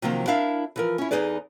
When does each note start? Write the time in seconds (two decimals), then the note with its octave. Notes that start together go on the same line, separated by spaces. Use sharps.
0.02 C3 D#3 F3 F#3 A#3 C4
0.27 D4 E4 A#4 E5 F5
0.76 E3 F3 A#4
0.98 C#4 E4
1.11 E2 E3 D#4 G#4 B4 D5